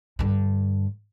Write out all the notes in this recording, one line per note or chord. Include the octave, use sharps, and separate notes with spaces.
G2 D3